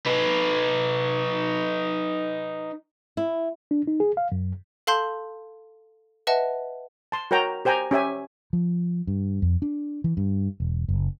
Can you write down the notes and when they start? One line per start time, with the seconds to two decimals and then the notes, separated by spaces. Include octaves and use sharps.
0.06 D#4 B4
3.17 E4
3.71 D4
3.87 D#4
4.00 G#4
4.17 F5
4.32 F#2
4.87 A4 F5 A5 C6 G6
6.27 B4 D#5 E5 F#5 A5
7.12 A5 C6
7.31 F#4 A#4 C#5 G5 A#5
7.65 G4 C5 G5 G#5 A#5
7.91 C#4 G4 E5 G#5
8.53 F3
9.07 G2
9.42 F2
9.62 D4
10.04 E3
10.17 G2
10.60 E1
10.88 F#1